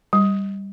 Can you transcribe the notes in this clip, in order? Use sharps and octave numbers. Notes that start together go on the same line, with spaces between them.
G3